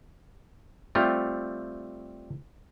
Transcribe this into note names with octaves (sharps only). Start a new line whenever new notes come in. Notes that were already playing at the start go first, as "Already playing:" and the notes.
G3 A3 C4 F4